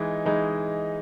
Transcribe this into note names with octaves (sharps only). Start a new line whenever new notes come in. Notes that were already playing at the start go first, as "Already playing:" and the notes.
Already playing: E3 G#3 D#4
E3 G#3 D#4